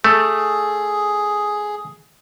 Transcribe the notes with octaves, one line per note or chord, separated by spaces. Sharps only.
A3 G#4